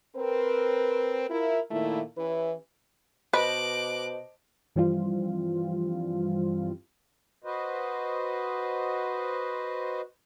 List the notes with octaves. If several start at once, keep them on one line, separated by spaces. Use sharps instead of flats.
C4 A#4 B4
E4 F4 A#4
A#2 D#3 A3 A#3 E4
E3 C#4 E4 G4 B4
B2 B4 C5 D#5 A5 D6 F#6
G2 E3 F3 G3 C4 F4
F#4 B4 C5 D#5